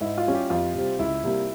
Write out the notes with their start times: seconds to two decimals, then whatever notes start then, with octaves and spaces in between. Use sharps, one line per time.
0.01 G#2 E4
0.18 F4
0.26 G3 C#4
0.33 G4
0.50 F2 F4
0.75 C3 G3 C4
0.99 C#2 E4
1.24 C3 G3 A#3